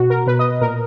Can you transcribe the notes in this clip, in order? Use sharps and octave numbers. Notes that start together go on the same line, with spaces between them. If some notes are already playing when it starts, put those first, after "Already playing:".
Already playing: B2 F#4
A#4
B2 B4
D#5
A#2 A#4